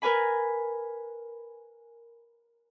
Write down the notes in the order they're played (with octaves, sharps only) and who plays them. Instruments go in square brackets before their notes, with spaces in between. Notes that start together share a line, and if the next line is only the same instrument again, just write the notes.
[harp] A#4 B4 G#5 B5